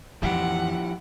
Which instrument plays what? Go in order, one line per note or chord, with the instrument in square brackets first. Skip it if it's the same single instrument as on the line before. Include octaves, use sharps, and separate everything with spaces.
[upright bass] F2 E3 [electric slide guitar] F3 E4 G4 [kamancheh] F#5